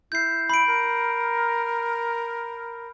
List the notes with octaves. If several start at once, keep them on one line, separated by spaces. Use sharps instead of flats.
E4 G6 C7
B5 D7
A#4